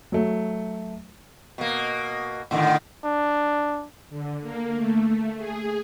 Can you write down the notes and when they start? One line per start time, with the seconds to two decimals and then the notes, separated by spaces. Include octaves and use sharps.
0.12 F#3 A3
1.58 B2 A#3
2.51 A2 D3 D#3
3.04 D4
4.10 D3
4.41 A#3
4.75 A3
5.38 G#4